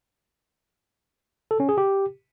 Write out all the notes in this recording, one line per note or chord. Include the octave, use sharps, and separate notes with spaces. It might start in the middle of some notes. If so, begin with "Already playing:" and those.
A4
C#4
G#4
G4